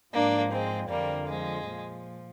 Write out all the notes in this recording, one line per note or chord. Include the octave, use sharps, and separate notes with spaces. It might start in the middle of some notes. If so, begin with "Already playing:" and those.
G#2 F3 A#3 D4
G#3 C4
F2 D3 F3 G3 A#3
F3 G#3
A#2 F3